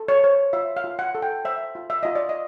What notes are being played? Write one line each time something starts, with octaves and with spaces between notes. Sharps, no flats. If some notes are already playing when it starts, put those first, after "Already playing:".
Already playing: A4
C#5
C5 C#5
F4 E5
F5
F4
F#5
A4
G5
C5 E5
F4
E5
F4 D#5
D5
D#5